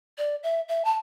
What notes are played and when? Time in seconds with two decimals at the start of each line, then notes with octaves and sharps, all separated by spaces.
0.18 D5
0.43 E5
0.69 E5
0.85 A5